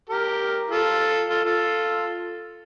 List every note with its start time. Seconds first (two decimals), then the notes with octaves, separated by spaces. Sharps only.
0.09 G4 A#4
0.70 F4 A4
1.29 F4 A4
1.44 F4 A4